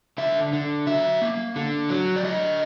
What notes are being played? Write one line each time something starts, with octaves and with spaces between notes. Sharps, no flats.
D3 E5
D3
F#3 E5
A#3
D3
F#3
D5
D3 D#5